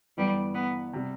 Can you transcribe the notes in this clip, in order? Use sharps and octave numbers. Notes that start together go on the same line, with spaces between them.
G1 G2 E3 G3 B3
B3
C3 G3